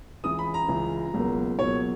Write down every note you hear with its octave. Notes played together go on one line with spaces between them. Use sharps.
C#2 C#3 E3 D#6
B5
A#5
C#2 C#3 E3
C#2 B2 F#3 A#3
C#2 B2 F#3 A#3 C#5